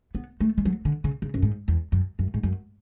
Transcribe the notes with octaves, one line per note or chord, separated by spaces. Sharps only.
B3
A3
G#3
F#3
D3
C#3
C#3
F#2
G#2
E2
F#2
F#2
G#2
F#2